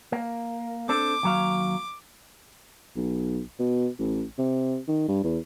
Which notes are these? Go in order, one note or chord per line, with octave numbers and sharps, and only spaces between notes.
A#3
C4 D4 A4 D6
D#2 F#3 F5
B1
B2
A1
C3
D#3
G2
E2